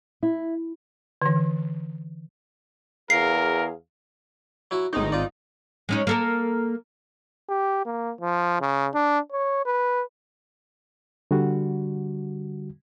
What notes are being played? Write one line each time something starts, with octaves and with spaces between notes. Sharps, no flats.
E4
D3 E3
E2 G#4 A#4 F5 C7
F#3 E4 F#4
G#1 A2 G#3 D#4
F4 D5
G#3 C#4 D#4
A#3 A4 A#4
G4
A#3
F3
C#3
D4
C#5
B4
D3 G3 F#4